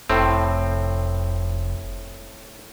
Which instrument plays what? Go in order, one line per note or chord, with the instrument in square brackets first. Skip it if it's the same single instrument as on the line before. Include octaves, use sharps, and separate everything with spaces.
[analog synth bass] F1 [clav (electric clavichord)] A2 C4